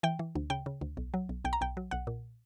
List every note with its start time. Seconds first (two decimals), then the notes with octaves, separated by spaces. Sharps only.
0.03 E3 G5
0.19 E3
0.35 D2
0.50 C#3 G5
0.66 C#3
0.81 D2
0.97 B1
1.14 F#3
1.29 B1
1.45 B1 G5
1.53 A#5
1.61 B1 G5
1.77 F#3
1.91 B1 F#5
2.07 A#2